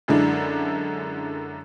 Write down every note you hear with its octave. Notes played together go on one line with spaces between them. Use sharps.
F#2 D3 G#3 D4 E4